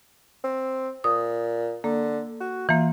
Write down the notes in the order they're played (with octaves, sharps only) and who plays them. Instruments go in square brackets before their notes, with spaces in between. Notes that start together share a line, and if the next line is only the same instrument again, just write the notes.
[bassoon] C4
[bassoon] A#2 [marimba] D#6
[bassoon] D3 [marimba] A#3
[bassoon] F#4
[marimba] E3 A#3 [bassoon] F4